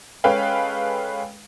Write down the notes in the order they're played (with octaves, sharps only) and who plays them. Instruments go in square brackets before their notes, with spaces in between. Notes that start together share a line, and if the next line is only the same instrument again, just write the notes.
[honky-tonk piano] G#3 C#4 A4 B4 F5 G5